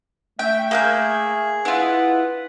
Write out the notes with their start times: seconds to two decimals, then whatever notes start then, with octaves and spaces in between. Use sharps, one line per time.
0.39 A3 E5 G5
0.71 A#3 G#4 G5 G6
1.65 E4 F4 B4 F#5